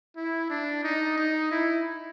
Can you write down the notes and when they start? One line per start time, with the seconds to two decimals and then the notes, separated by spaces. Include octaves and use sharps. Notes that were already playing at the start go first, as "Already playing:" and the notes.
0.16 E4
0.50 D4
0.83 D#4
1.18 D#4
1.51 E4